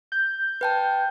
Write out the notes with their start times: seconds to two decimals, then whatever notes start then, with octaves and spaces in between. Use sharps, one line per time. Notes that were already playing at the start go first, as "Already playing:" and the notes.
0.12 G6
0.61 B4 G5 A5